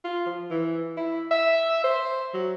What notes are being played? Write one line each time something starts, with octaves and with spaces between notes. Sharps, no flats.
F4
F3
E3
E4
E5
C5
F#3